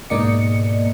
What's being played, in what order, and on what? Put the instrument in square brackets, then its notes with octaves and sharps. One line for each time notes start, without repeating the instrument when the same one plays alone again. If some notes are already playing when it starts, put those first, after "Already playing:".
[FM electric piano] G#2 B2 A#3 D5 D#5 C#7